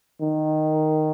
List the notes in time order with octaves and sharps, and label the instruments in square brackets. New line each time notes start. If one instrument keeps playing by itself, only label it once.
[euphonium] D#3